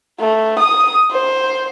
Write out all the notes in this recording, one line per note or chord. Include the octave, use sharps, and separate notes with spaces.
A3
D#6
C5